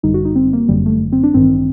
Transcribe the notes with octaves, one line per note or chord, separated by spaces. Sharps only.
G1 F#2 D3 G3 D#4
F#4
D#4
C4
A#3
G1 F#2 D3 F#3 G3
A3
C4
D4
A1 G2 D#3 C4